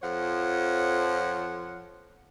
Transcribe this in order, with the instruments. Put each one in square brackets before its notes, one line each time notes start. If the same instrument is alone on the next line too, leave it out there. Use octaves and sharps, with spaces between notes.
[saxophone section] F2 F3 C#5 F#5